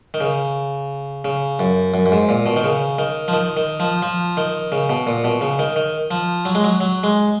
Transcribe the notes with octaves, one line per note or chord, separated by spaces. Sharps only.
D#3
C#3
C#3
F#2
F#2
F#2
G#2
A#2
B2
D#3
C#3
D#3
F3
D#3
D#3
F3
F3
D#3
C#3
B2
A#2
B2
C#3
D#3
D#3
F3
F#3
G#3
F#3
F#3
G#3